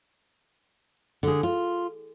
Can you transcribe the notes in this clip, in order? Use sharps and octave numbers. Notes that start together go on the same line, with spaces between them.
D3 G#4
F4